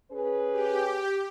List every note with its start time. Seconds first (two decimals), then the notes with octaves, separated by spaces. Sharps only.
0.11 C#4 G#4 B4
0.52 G4